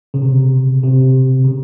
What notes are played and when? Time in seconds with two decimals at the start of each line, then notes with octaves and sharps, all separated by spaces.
0.14 C#3
0.22 C3
0.83 C3
1.45 C#3